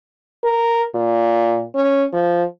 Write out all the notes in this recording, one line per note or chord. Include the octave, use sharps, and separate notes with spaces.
A#4
A#2
C#4
F3